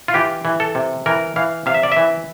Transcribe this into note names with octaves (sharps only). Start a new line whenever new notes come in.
F4
E3 G4
E3
A4
C3
E3 A#4
E3 F5
C3 F5
E5
D5
E5
E3